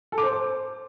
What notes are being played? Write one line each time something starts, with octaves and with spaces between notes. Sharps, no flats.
A4
D6
C5